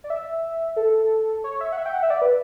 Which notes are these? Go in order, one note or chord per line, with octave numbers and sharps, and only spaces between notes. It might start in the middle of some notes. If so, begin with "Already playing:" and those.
D5
E5
A4
C#5
E5
F#5
E5
G5
F#5
E5
D5
B4